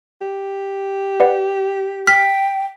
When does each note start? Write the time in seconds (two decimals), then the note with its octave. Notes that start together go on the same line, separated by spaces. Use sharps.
0.21 G4
1.20 B4 D5 F#5
2.07 G5 F6 B6